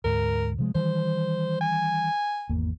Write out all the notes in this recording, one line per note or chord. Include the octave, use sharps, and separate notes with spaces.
D2 G#2 A#4
C3 F3 G#3
D#3 E3 G3 C5
G#5
G#1 E2 A#3